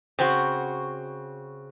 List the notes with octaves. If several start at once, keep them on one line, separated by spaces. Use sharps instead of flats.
C#3 C4 F#4